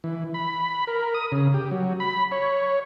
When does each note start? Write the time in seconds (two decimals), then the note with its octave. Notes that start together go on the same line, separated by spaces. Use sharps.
0.04 E3
0.34 B5
0.87 A#4
1.14 D#6
1.32 C#3
1.54 G4
1.71 F#3
2.00 B5
2.32 C#5